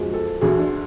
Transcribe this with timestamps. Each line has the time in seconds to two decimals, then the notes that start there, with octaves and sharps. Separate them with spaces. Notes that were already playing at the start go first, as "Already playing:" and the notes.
Already playing: F#2 F3 G#3
0.14 A4
0.41 D2 D3 F#3 A3 G#4
0.59 D4